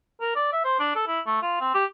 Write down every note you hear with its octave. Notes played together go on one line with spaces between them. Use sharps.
A#4
D5
E5
C5
D4
A4
E4
A3
F4
C4
G4